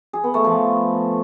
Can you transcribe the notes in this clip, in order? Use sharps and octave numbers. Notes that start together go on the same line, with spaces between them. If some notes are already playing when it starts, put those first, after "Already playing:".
G#4
B3
A3
F3